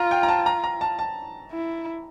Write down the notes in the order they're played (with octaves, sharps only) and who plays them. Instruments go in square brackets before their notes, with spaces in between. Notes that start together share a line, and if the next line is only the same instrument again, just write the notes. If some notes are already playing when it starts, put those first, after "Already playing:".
Already playing: [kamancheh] F4 [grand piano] A#5
[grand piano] G5
A#5
A5
A#5
A#5
A5
A5
[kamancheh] E4